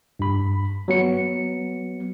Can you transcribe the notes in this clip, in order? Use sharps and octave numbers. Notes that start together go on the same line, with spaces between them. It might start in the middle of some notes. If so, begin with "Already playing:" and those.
G2 B5
F#3 B3 C#7